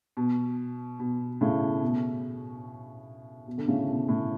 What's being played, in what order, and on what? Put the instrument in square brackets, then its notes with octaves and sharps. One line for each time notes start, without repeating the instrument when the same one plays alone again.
[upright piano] B2
B2
A2 C#3
B2
B2
D3
A2 C#3
B2
A2